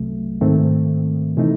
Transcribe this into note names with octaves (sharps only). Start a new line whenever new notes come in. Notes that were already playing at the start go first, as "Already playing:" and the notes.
Already playing: C2 C3 F#3 A3
G#2 D#3 A3 C4
C3 E3 A3 D#4